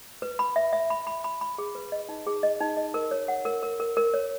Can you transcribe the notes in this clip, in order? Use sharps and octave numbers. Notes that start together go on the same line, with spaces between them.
B4
B5
E5
E5
B5
B5
B5
B5
G#4
B4
D#5
D#4
G#4
D#5
D#4
D#5
A#4
C#5
F#5
A#4
A#4
A#4
A#4
C#5